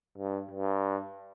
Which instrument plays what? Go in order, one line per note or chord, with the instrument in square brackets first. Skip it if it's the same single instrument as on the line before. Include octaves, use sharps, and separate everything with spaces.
[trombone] G2
G2